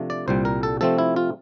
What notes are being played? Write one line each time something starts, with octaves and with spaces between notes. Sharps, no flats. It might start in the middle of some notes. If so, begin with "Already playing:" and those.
Already playing: C3 F3 A3 D4
D5
C2 A#2 G3 C5
A#4
A4
C3 F3 A3 C4 A4
E4
F4